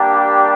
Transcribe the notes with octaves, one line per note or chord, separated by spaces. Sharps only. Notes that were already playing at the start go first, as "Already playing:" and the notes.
Already playing: G3 A#3 D4 G4